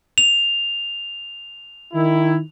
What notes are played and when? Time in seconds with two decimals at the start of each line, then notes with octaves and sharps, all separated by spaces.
0.18 F7
1.94 D#3 E4